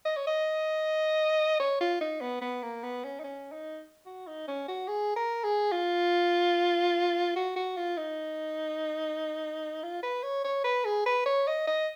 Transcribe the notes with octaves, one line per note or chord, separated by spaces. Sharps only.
D#5
C#5
D#5
C#5
F4
D#4
B3
B3
A#3
B3
C#4
D#4
C#4
D#4
F#4
D#4
C#4
F#4
G#4
A#4
G#4
F4
F#4
F#4
F4
D#4
F4
B4
C#5
C#5
B4
G#4
B4
C#5
D#5
D#5